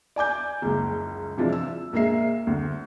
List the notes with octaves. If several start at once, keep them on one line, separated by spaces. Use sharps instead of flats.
D5 G#5 D6 G6
F#1 C#2
C3 E3 F3 G#3 D4
E6
A#1 G#3 A#3 E5 C7
D2